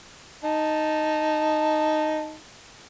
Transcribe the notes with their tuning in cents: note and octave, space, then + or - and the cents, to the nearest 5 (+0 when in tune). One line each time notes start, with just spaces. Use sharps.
D#4 -5 A5 +0